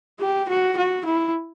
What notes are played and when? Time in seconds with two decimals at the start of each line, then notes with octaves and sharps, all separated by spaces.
0.20 G4
0.49 F#4
0.77 F#4
1.05 E4